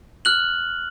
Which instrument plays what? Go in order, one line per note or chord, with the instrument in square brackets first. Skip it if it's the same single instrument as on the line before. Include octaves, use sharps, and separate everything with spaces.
[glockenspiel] F6 F#6 F#7